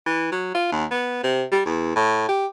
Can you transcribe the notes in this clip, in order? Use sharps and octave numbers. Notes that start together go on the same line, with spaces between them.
E3
F#3
F4
D#2
B3
C3
G3
E2
A2
G4